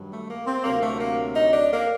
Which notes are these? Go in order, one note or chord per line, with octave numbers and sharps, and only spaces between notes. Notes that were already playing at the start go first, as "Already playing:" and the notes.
Already playing: G2 D#3 F#3
A3
A#3
C4
D2 C3 F#3 A#3
A3
A#3
D#4
D4
A#3